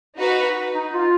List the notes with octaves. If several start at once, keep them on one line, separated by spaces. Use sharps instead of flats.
D#4 F#4 B4
D#4
F4